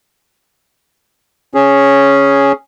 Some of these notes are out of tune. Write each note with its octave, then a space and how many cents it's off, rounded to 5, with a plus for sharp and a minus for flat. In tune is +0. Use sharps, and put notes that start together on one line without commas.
C#4 +0 G#4 +0